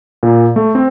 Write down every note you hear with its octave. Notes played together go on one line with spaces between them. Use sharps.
A#2
A3
C4